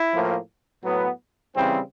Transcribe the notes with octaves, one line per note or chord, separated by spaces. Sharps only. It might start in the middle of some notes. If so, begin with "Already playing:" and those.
Already playing: E4
A2 F3 A#3
A2 F#3 B3
C#3 E3 G3 C4